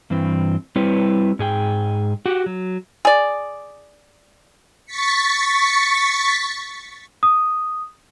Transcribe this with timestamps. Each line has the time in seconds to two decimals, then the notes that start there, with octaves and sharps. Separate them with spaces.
0.10 G2 E3 C4
0.76 G3 C4 E4 G4 B4 C#5
1.39 G#2 G#4 G5
2.26 F#4 G4 F#5
2.46 F#3
3.05 G#4 D5
4.85 C#6 A6 B6 C#7
7.23 D#6